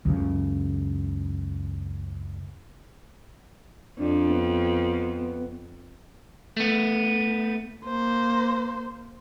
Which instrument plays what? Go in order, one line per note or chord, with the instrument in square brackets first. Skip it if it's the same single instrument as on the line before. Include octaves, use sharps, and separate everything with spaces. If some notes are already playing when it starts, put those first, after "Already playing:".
[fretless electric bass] C#2 F#2 C#3
[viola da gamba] F2 [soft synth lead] D4
[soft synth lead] B3
[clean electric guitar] A3 B3
[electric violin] A#3 C5